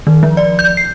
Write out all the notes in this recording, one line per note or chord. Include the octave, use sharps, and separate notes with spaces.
D#3
F3
D5
G6
C7